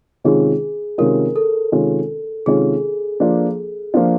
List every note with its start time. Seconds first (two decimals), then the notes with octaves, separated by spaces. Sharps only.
0.24 C3 D#3 G#3 C#4 F4 G#4
0.98 C3 D#3 G#3 C#4 F4 A#4
1.36 A4
1.72 C3 D#3 G#3 C#4 F4
2.46 C3 D#3 G#3 C#4 F4 G#4
3.20 F3 A#3 D4 F4
3.94 F3 A#3 D4 F4